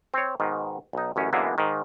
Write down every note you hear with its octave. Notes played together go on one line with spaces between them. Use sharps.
C4 C#5
G#2 B2 D#3
B1 D#4
A1 F#2 C#4
F#2 D3 E3 G#3 A#3 B3
G#2 D#3